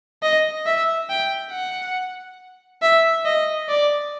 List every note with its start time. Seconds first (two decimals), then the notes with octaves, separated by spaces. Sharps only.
0.23 D#5
0.66 E5
1.09 G5
1.52 F#5
2.82 E5
3.25 D#5
3.68 D5